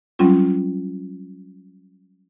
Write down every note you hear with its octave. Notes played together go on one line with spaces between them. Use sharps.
F#3 G3 C4 C#4 F4